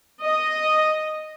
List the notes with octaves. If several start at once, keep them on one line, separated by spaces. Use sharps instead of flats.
D#5